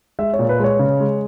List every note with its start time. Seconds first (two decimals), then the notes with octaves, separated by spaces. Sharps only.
0.19 G#3 E5
0.33 C#5
0.39 A#2
0.49 B4
0.59 G#3 C#5
0.79 C#3
1.00 G#3